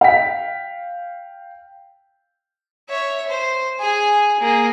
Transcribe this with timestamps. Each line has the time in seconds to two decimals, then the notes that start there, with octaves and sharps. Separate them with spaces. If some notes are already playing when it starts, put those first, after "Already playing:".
0.01 F5 G5 B6
2.89 C#5 E5
3.29 C5
3.80 G#4 G#5
4.40 A#3 G#4